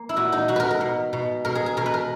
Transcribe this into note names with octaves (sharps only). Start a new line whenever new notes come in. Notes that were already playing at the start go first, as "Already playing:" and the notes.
Already playing: A#3
E4
A#2 F#4
D#4
B2 F#4
A#4 B4
A#4
B2
B2
B2 A#4
G#4
G#4
B2 A#4
B4
A#4